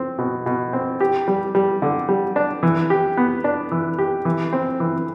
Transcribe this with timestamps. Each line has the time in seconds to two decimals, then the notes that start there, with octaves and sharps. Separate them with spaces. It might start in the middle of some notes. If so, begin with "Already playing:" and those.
Already playing: C4
0.18 B2
0.46 B2
0.73 C4
1.00 G4
1.28 G3
1.55 G3
1.82 D3
2.09 G3
2.36 D4
2.63 E3
2.90 G4
3.17 B3
3.44 D4
3.71 E3
3.99 G4
4.25 E3
4.53 C4
4.80 E3